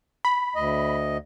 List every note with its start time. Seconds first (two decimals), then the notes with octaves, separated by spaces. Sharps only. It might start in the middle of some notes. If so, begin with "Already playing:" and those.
0.25 B5
0.56 D2 D#5